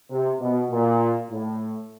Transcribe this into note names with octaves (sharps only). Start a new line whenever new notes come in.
C3
B2
A#2
A2